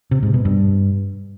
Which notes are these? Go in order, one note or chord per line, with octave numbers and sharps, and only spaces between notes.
C3
G#2
B2
G2